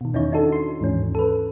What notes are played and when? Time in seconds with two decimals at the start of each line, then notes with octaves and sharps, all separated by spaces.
0.01 B2 D#3
0.14 E2 C#4 D#4 E4 C#5
0.32 D4 D#4 F#4 A4
0.52 C6
0.80 D#2 G#2 E3 C#4
1.15 A4 B4